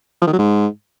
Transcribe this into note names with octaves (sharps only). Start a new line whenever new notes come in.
F3
D#3
F#3
G#2